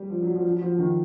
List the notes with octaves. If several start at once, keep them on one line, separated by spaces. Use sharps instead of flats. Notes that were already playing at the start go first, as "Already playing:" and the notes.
Already playing: G3
F3
F#3
F3
F#3
F3
D#3